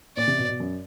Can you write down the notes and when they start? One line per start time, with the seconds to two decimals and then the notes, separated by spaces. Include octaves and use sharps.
0.17 A#2 D5
0.28 C3
0.39 B2
0.49 B2
0.60 F#2